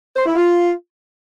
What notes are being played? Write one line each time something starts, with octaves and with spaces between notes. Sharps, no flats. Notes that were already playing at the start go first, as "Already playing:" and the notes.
C5
E4
F4